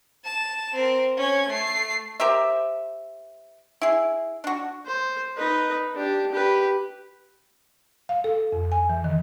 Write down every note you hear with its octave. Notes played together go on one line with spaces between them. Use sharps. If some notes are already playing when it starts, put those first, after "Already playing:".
A5 E7
C4 A#4
C#4 G#6
A3 C7
G4 A#4 C5 E5
E4 G#4
D4 F#4
C5
D#4 B4
D4 G4
G4 B4
F5
A4
F2
G#5
E3
D#3